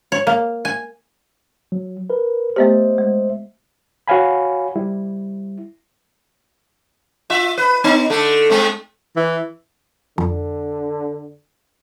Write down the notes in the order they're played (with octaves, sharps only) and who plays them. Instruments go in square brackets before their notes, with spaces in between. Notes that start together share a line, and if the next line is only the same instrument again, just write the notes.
[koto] C#5
A#3
G#5
[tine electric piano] F#3
A#4 B4
[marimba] A3 B3 G4 [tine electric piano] C5 D#5 E5
[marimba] G#3
[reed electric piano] F#4 C#5 F5 G#5 B5
G3 E4
[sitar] F4 E5
B4
B3 D#4
D3 A3
G#3 A3 C4
[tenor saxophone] E3
[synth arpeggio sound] F2 [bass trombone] D3